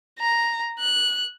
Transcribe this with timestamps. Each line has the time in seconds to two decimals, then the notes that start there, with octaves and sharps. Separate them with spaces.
0.20 A#5
0.80 F#6